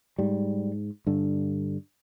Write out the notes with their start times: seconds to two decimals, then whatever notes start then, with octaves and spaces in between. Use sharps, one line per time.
0.19 G#2 G3
1.07 G2 D3